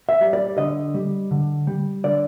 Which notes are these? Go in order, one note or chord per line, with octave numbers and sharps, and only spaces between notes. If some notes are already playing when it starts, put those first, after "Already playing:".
E5
G3
D5
D3 D#5
G3
D3
G3
D3 D5